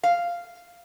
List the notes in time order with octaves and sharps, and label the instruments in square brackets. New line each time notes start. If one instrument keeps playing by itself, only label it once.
[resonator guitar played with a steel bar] F5